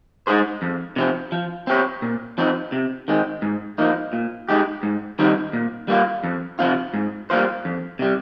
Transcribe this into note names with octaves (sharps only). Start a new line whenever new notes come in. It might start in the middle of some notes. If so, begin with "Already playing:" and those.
G#3 D#4 G#4 C5
F2
C3 F3 C4
F3
C4 G4 C#5
A#2
F3 C4 D#4
C3
D#3 G#3 C4
G#2
F3 A#3 D#4
A#2
G#3 D#4 G4
G#2
D#3 G3 C4 D#4
A#2
G3 A#3 F4
F2
C3 F3 C4 F4
G#2
G3 A#3 F4 C5
F2
C3 G3